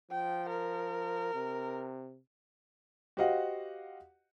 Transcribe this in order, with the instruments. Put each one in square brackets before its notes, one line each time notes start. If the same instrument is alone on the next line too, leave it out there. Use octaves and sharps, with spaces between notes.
[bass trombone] F3 [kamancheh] G5
[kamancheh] A#4
[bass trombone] C3
[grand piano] F#4 G4 C5 D#5 F5 F#5